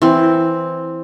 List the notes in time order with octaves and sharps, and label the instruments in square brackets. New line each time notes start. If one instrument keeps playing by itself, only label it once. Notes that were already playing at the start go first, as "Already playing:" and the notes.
[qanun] E3 C4